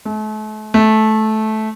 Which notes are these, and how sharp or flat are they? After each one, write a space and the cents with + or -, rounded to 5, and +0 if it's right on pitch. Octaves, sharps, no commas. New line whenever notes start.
A3 -40
A3 -15